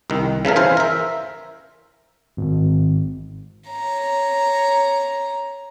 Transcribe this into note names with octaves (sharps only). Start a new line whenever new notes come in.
C2 D#3
C#3 E3 A4 A#4
E3 C5 F5 G#5
A#4 E5
G#1
C#5 A#5